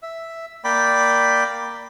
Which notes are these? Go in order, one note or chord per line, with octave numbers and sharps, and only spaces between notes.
E5
A#3 D5 G5 B5